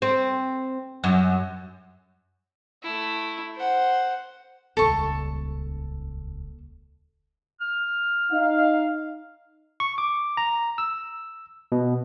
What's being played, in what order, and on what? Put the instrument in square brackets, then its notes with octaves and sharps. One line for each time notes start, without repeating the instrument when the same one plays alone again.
[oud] C4
F#2
[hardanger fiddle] A3 E4
C5 F#5
[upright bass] D#1 C#2 [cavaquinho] A4 C#6
[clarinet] F6
[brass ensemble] D#4 F5
[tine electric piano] C#6
D6
A#5
E6
B2